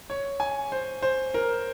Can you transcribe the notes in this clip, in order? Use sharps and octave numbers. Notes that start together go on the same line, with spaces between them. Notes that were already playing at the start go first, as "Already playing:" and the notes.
C#5
G#5
C5
C5
A#4